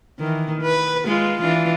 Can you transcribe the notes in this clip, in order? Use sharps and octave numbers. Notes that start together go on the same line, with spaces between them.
D#3 E3
B4
G#3 F4
E3 D4 F4